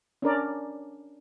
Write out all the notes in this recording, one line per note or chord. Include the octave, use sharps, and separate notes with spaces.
C#4 D4 A#4 D5